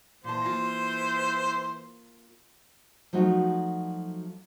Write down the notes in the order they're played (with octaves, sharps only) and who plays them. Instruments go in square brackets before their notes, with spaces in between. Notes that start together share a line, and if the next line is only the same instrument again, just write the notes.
[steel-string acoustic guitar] A#2 A5 [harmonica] E3 C5
[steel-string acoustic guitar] A#3 F4
[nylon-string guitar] F3 F#3 A3 D#4 F#4